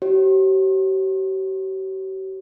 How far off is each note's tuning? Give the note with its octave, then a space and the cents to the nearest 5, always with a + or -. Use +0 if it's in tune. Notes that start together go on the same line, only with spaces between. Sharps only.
G4 -45 C#5 -35